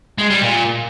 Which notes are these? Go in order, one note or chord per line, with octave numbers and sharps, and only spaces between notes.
G#3
G3
A#2